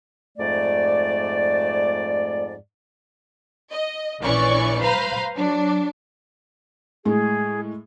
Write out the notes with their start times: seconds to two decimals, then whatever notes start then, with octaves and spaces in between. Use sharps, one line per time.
0.38 F2 G#2 A3 D5
3.72 D#5
4.23 A#1 E3 C#4 D5 C#6
4.81 B4 C5 F5 A#5 B5
5.37 F#3 D4
7.05 A2 G#3 G#4